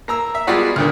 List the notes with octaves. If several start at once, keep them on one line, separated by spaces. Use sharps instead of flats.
A#3 A#5 E6
E5
G3 G#3 B3 F4 F#4 D5
D2 A#2 D3 D#3